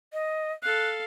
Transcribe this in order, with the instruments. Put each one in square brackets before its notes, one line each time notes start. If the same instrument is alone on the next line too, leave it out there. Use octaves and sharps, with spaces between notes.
[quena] D#5
[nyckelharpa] A4 F5 [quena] F#6